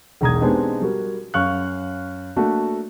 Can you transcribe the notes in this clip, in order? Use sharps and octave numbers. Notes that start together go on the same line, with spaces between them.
E1 B1 A#5 D#6 G#6
G#3 B3 C4 D4 D#4 G4
G3 F#4 A#4
F#2 F5 C#6 F6 F#6
A3 A#3 D4 F#4